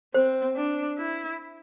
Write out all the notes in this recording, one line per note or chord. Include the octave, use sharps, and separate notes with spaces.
C4 C5
D4
E4